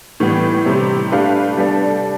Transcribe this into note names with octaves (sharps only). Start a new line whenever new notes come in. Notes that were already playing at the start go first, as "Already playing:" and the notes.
A2 E3 G3 B3
C3 G3 C4 G4
A3 D4 G4 B4 F5
G3 B3 D4 A4 D5